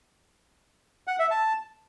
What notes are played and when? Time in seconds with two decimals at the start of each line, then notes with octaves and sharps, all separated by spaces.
1.07 F#5
1.19 E5
1.31 A5